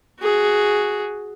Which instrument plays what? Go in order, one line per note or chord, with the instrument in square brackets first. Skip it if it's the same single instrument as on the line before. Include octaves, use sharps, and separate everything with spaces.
[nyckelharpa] F#4 G#4